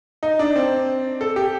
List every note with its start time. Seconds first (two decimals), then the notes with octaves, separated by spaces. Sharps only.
0.23 D#4
0.39 D4
0.56 C4
1.21 A4
1.36 G4